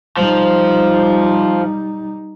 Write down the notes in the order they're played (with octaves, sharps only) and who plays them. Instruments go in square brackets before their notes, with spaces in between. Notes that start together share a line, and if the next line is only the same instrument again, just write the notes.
[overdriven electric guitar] F3 [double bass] G3 D#4